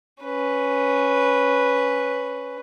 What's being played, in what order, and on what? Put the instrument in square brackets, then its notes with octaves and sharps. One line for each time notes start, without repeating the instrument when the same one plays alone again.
[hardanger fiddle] C#4 B4